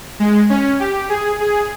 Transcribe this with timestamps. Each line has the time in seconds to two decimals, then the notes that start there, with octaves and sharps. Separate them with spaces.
0.19 G#3
0.50 C#4
0.80 G4
1.09 G#4
1.40 G#4